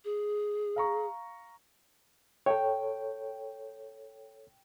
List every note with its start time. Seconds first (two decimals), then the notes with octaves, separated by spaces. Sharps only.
0.05 G#4
0.76 F5 A#5 C#6
2.46 A4 C#5 G5